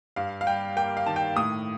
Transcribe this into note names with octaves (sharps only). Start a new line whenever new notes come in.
G2 F5
F5
G3 G5
A#3 G5
F5
D#3 A5
G5
A2 D#6